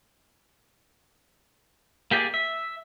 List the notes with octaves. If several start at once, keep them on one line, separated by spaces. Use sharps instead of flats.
A#3 G4 G#4 D5
E5